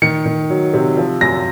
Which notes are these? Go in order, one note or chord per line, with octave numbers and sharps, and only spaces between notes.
D#3 C#7
D#3
F#3
C3
F3
F#2 A#6